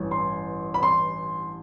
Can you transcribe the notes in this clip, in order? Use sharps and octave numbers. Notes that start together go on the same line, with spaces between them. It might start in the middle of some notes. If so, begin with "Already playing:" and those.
Already playing: A1 G2 E3
C6
B5
C6